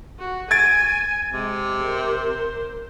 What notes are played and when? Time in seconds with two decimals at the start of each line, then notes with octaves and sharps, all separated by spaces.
0.19 F#4
0.51 G#5 G#6 A6 D7
1.33 C3 G#3
1.83 A#4 C5